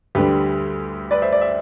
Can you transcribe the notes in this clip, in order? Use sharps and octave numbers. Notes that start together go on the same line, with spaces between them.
D2 D3 G3 G4 B4
B4 D5
C5 E5
D5
E5